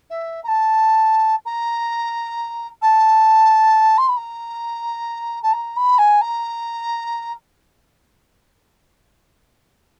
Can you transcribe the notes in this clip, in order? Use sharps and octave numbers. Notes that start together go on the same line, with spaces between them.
E5
A#5
A5
A#5
A5
C6
B5
A#5
A5
A#5
B5
G#5
A#5